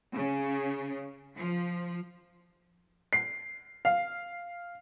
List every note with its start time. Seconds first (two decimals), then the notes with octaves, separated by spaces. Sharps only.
0.15 C#3
1.35 F3
3.13 C7
3.85 F5